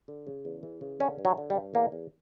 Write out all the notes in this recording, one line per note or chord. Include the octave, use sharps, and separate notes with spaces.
D3
C#3
E2
E3
C#3
D3 C#4
G2
F#3
D3
G3
G2
E2 A#3
E2